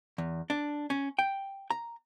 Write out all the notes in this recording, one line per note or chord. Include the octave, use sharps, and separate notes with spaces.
E2
D4
C#4
G5
A#5